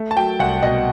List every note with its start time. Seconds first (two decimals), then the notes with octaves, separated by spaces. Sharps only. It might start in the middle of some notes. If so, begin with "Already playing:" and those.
Already playing: A3
0.11 A5
0.16 F#3 G5
0.39 C2 F#5
0.63 B2 D#5